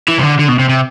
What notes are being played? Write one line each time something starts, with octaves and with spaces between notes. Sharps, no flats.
E3
C3
D3
D3
B2
C3
C3